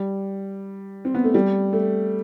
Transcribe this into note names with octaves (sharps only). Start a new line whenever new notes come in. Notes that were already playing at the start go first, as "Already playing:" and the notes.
Already playing: G3
C4
B3
A3
G3
A3